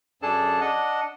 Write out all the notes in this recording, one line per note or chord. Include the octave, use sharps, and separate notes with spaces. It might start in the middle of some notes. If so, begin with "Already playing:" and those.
F#2 D4 G#4 A4 A5
D4 D#5 F#5